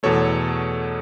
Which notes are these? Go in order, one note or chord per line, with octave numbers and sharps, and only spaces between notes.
E2 B2 A3 A4 C#5